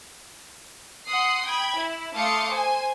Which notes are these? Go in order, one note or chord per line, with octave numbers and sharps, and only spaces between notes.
F#5 C6 D#6 C7
G5 B5 G#6
E4
A3 F5 C6 D6 D#6 C#7
C5 G#5